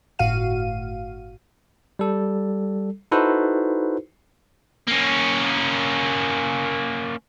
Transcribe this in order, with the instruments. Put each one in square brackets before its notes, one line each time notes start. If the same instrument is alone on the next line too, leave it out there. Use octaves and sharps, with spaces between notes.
[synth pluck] G1 A2 F#4 F5 D#7
[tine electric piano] G3 A4
D#4 E4 F#4 A4 B4 C5
[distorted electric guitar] A#3 C#4